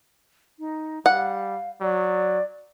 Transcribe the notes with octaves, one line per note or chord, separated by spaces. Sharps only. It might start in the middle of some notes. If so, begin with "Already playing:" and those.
D#4
G3 F5 F#5
F#3 D5